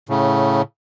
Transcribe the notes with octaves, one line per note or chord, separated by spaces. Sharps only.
A2 C#3